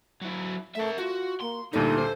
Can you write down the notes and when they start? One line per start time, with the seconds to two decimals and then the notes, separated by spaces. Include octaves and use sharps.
0.22 F#3 E4
0.75 A3 A#4 E5
0.99 F4 F#4
1.41 A#3 C6
1.73 D2 A#2 G3 D#4 A4
1.98 C5